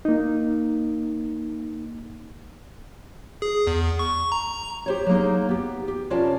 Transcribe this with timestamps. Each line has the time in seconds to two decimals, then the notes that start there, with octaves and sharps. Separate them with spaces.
0.05 A#3 D#4
3.42 G#4
3.67 E2
3.99 C#6
4.32 A#5
4.86 G4 C5 C#5
5.06 F#3 G#3 A#3 D#4
5.49 B3 G4
5.88 G4
6.10 C3 C#4 F4 A#4 D5 A5